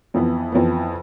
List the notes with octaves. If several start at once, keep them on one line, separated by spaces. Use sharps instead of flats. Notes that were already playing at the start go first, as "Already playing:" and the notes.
F2 E3 B3
F2 E3 B3